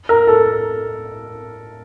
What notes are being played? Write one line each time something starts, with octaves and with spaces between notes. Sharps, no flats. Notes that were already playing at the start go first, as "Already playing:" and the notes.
A#4
A4